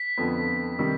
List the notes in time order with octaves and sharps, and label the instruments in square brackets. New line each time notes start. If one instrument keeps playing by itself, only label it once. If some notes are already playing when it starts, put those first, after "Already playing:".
Already playing: [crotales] B6
[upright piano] F2 D3 F3 B3
C3 D#3 G3